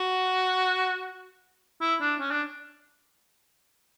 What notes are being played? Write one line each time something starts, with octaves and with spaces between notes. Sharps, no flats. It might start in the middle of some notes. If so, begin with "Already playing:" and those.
Already playing: F#4
E4
D4
C#4
D4